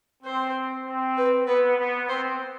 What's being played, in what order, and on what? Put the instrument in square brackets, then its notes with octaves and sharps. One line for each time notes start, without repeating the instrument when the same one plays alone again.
[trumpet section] C4 [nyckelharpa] C5
[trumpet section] C4
[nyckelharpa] B4
[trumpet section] B3 [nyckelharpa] B4
[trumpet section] B3
[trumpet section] C4 [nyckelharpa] C5